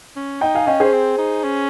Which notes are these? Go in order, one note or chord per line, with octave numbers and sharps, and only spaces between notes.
C#4
D#4 D#5 G5
F5 G#5
C#4 D#5 G5
G#4 C5
C4
D#4
C#4